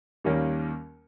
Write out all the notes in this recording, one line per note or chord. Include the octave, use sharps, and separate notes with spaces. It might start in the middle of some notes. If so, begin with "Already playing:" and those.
D#2 D#3 G3 A#3 C#4